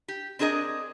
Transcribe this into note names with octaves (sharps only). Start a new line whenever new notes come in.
G4
C4 D4 G#4 A#4 D#5